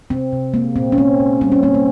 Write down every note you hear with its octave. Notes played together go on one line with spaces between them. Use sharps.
C3 C4
C3
G#3 A#3
A#2 C4
C#4
G#3 C4
A#2
G3 C4
C#4
A#3 C4
A#3